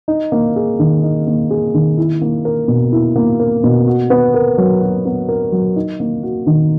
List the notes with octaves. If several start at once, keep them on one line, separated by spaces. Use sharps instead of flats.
D#4
A#3
G#4
D#3
D#4
A#3
G#4
D#3
E4
A#3
A#4
B2
E4
A#3
A#4
B2
F#4
B3
A#4
F#3
F#4
B3
A#4
F#3
D#4
A#3
F#4
D#3